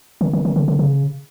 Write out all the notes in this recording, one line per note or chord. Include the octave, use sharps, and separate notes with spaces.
D#3
D#3
D#3
D3
D3
C#3